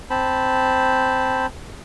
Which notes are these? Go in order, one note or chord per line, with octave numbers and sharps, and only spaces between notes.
C4 C5 A5 B5